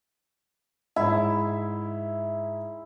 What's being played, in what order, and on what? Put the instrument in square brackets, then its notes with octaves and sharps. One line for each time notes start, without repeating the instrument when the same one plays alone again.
[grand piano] G#2 E5 [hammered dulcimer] E4